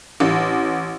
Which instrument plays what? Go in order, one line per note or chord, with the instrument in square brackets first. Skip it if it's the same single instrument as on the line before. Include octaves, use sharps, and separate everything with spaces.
[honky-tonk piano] A1